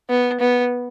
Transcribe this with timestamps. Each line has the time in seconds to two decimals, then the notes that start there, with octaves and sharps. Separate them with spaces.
0.10 B3
0.40 B3